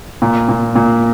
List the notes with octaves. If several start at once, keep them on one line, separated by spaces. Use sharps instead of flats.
A#2
A#2
A#2